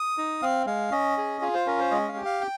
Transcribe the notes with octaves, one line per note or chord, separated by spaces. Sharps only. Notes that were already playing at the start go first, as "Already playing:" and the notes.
Already playing: D#6
D#4
C4 F5
G#3 F5
C#4 D#5
G#4
F4 G#4
C5
C#4 A#4
C5
G#3 D#5
F5
G4
F5
G5